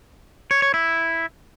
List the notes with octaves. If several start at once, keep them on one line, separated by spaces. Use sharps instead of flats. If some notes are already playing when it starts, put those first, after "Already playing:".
C#5
C#5
E4